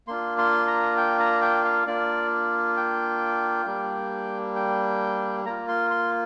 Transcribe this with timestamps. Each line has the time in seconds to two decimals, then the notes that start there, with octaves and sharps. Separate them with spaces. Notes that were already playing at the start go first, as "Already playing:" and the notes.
0.08 A#3 D4 F4 C6
0.38 C6
0.67 A#5
0.97 G5
1.20 A#5
1.42 G5
1.64 F5
1.87 A#3 D4 F4 D5
2.77 G5
3.66 G3 A#3 D4
4.56 G5
5.46 A#3 F4 A#5
5.68 C6
5.91 C6